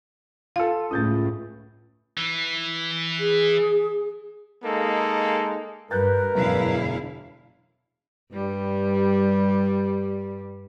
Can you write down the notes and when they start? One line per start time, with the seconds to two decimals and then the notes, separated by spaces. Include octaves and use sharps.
0.56 F4 A4 F5
0.91 C#2 A2 D#6 G6 A6
2.18 E3
3.19 G#4
4.64 G#3 A#3 D#4 A4
5.91 G2 A#4 B4 F#6 G6 A6
6.35 E1 F#2 D3 E4 F5
8.32 G2 G3